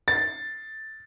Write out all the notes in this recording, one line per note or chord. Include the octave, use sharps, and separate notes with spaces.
A6